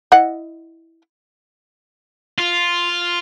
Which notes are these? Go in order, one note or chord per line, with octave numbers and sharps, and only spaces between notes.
E4 D#5 F#5
F4